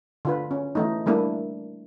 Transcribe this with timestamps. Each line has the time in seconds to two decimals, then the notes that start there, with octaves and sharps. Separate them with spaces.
0.25 D3 F4 B4
0.51 C#4
0.75 E3 A3 D#4
1.06 G3 A3 A#3 D4 E4